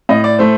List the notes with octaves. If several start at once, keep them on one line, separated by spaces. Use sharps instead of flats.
A2 D#5
D5
A3 C5